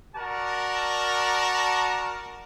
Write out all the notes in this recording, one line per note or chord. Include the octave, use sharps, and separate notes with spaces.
F#4 A#4 D5 A5 A#5